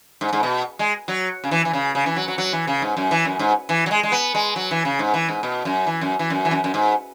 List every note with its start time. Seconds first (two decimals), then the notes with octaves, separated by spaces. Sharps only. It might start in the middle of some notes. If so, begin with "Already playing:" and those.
0.21 G#2
0.33 G#2
0.43 B2
0.79 G#3
1.08 F#3
1.44 C#3
1.51 E3
1.65 E3
1.73 C#3
1.95 C#3
2.06 E3
2.16 F#3
2.28 F#3
2.38 F#3
2.53 E3
2.67 C#3
2.82 G#2
2.97 F#2
3.11 E3
3.25 F#2
3.39 G#2
3.69 E3
3.86 F#3
3.91 G#3
4.03 G#3
4.12 B3
4.35 G#3
4.56 F#3
4.71 E3
4.85 C#3
4.99 G#2
5.14 E3
5.29 G#2
5.43 B2
5.65 F#2
5.87 E3
6.01 F#2
6.19 E3
6.30 F#2
6.45 E3
6.51 F#2
6.64 F#2
6.74 G#2